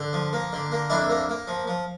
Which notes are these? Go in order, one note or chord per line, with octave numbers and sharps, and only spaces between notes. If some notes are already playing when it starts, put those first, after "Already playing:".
Already playing: D3
F3
A#3
D3
A#3
F2 D4 E4
A#3
A#3
F3
F3